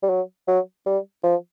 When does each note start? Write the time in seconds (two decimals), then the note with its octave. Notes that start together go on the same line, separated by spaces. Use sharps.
0.03 G3
0.09 F#3
0.48 F#3
0.86 G3
1.24 F3